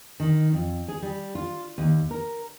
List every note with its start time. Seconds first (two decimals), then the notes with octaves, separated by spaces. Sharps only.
0.20 D#3
0.53 F2
0.88 G#4
1.02 G3
1.35 F4
1.78 D#2
2.11 A#4